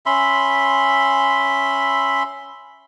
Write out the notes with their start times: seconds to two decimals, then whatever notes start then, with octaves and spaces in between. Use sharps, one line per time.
0.06 C#4 E5 B5 C6